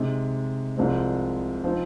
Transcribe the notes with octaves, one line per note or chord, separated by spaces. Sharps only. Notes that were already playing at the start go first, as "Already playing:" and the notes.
Already playing: C3 G#3 D#4
C2 C3 F3 G#3 C4
F3 C4 D#4